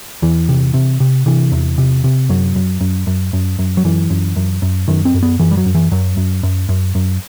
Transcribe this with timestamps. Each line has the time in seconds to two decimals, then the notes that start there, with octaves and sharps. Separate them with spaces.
0.22 E2 E3
0.49 C3
0.74 C3
1.00 C3
1.26 C3 E3
1.52 E2
1.78 C3
2.04 C3
2.29 F#2 F#3
2.56 F#2
2.81 F#2
3.07 F#2
3.33 F#2
3.59 F#2
3.77 F#3
3.85 F#2 E3
4.10 F#2
4.36 F#2
4.62 F#2
4.88 F#2 D#3
5.05 C4
5.14 F#2
5.23 B3
5.39 F#2 E3
5.51 G3
5.57 F#3
5.66 F#2
5.75 E3
5.92 F#2 F#3
6.17 F#2
6.43 F#2
6.69 F#2
6.95 F#2